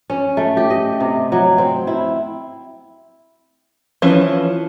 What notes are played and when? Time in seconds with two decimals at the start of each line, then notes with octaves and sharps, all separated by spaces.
0.10 C#4
0.37 A3
0.57 G4
0.70 D#5
1.00 C3
1.32 F#3
1.58 C4
1.87 E4
4.02 E3 F3 C#4